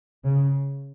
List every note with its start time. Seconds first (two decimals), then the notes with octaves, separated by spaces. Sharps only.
0.24 C#3